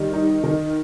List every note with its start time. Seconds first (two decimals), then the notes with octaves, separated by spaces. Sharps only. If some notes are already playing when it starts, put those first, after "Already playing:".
Already playing: D#3 G3
0.13 D#4
0.44 D#3